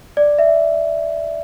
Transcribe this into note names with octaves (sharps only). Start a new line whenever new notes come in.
D5
E5